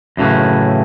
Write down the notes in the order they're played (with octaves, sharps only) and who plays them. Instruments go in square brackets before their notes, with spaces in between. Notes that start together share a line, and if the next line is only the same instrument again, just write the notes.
[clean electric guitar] F#2 A2 C#3 E3